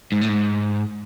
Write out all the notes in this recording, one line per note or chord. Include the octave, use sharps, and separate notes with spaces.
G#2
A2
G#2